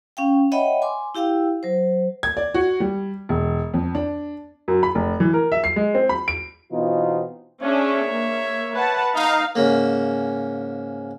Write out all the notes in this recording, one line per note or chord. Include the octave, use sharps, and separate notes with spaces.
C#4 F5 G5
C#5 D#5 E5 F#5 G5 B5
G#5 C6 D6
E4 G4 F5 G5 E6
F#3 C5
G#6
D5
F#4
G3
E1
F2
D4
F#2
B5
F1
E3
A#4
E5
C7
G#3
C4
B5
D7
B2 E3 B3 C4 D#4 F4
C#4 D4 G#4 C#5 E5
A#3
B4 F#5 A5
D#4 F5
G#2 C#3 A#3